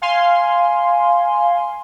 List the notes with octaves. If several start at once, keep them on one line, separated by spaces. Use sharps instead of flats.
F5 G#5 C6